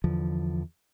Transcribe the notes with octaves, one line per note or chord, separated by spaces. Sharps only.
E2 D3 F3